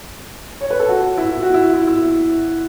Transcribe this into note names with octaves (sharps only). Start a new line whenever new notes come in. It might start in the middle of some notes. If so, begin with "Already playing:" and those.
C#5
B4
A4
F#4
E4
E4
F#4
E4
E4
E4